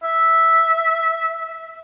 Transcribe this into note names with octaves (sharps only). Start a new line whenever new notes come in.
E5